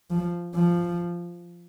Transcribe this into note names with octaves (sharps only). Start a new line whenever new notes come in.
F3
F3